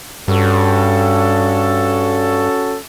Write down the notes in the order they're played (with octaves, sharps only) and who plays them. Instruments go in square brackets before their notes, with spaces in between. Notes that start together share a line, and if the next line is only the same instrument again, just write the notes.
[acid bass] G2 [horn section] C#4 F#4 A4